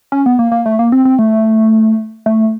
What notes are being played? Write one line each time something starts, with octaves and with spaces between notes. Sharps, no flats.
C#4
B3
A#3
A#3
A3
A#3
C4
C4
A3
A3